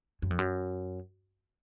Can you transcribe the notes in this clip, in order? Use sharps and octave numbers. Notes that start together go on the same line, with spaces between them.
F#2
F2
F#2